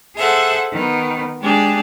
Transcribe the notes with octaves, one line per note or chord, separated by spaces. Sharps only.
G#4 A4 C5 E5 F#5
D#3 B3
G#3 D4 G4 G#4